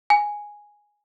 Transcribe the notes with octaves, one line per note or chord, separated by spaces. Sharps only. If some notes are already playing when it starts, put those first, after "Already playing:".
G#5